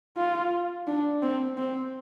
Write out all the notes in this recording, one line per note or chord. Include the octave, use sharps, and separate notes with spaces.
F4
D4
C4
C4